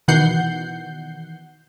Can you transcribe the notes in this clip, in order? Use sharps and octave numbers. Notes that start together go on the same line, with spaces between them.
B2 D#3 E3 F#5 G6 C7